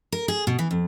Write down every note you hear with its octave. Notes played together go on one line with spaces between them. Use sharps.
A#4
G#4
B2
E3
F2